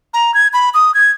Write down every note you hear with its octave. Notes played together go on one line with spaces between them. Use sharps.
A#5
G#6
B5
D#6
G#6